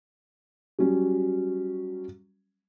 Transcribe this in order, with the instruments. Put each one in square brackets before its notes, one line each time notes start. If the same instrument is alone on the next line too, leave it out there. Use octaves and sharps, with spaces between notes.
[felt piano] F#3 G3 C#4